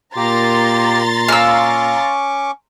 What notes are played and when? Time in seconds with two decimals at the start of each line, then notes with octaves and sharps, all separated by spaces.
0.16 A#2 A#3 G4 A#5 C6 A6
1.28 C#4 F5 C#6 D6 E6